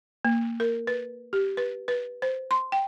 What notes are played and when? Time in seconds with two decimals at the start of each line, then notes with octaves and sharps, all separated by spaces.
0.25 A#3
0.60 A#4
0.87 B4
1.33 G4
1.57 B4
1.88 B4
2.22 C5
2.51 C6
2.72 G5